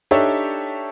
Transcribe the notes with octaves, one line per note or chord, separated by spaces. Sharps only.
D4 D#4 G4 A4 C#5 E5